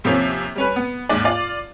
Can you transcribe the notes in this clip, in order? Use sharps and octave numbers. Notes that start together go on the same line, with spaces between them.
D#2 C3 F3 A#3 C#4
G3 C#4 B4
B3
D#2 G#2 D5
F4 D5